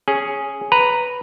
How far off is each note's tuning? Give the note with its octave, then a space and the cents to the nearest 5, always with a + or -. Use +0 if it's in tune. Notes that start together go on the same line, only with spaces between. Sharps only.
C#4 +0 G#4 +0
B4 +0 A#5 +0